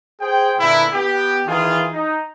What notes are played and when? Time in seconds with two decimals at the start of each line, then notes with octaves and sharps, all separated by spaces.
0.21 G#4 C5 G5
0.59 A#2 D3 B3 E4
0.93 B3 G4
1.45 D#3 E3 F4 G#4
1.93 D#4